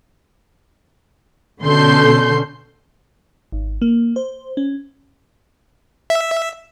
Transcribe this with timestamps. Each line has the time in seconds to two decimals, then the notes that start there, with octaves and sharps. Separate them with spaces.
1.62 B2 D3 C#4 A4 C6 G6
3.52 G#1
3.82 A#3
4.16 C5
4.57 C#4
6.10 E5